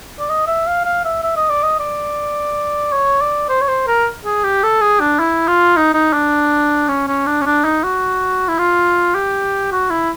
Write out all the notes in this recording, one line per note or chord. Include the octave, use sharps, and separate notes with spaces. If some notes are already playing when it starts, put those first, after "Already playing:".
D5
D#5
E5
F5
F5
E5
E5
D#5
D5
D#5
D5
C#5
D5
C5
C#5
C5
A#4
G#4
G4
A4
G#4
D4
E4
F4
D#4
D#4
D4
C#4
C#4
D4
C#4
D4
D#4
F#4
E4
F4
G4
F#4
E4